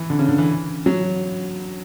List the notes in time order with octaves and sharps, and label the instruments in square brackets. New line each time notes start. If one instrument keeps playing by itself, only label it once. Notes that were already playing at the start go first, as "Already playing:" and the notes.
Already playing: [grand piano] E3
D3
C#3
D3
E3
F#3